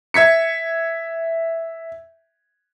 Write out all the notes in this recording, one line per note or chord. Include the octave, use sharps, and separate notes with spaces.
E5 G#6 B6 C#7